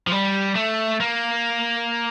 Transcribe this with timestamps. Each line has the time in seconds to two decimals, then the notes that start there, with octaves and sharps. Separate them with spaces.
0.07 F3
0.11 G3
0.55 A3
1.00 A#3